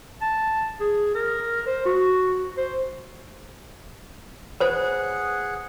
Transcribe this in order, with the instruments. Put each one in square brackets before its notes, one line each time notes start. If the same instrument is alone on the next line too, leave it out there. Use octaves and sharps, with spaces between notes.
[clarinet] A5
G#4
A#4
C5
F#4
C5
[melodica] G#4 F#5 [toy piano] B4 C5